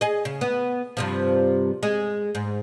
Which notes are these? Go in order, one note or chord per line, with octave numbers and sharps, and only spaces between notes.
G#4 D#5
C#3
B3
G2 C3 F3
G#3
G#2